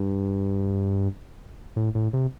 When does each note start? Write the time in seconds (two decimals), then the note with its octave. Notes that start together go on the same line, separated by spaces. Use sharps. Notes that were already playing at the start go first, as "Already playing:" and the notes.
Already playing: G2
1.76 A2
1.95 A2
2.13 C3